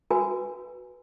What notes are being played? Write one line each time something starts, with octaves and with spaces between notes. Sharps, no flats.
F#4 B4 G#5